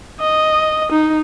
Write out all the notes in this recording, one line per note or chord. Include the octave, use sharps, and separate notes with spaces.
D#5
D#4